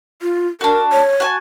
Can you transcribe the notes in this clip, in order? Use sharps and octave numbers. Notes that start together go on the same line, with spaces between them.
F4
D4 F#4 A#4
C#5
F#4 G#5 A5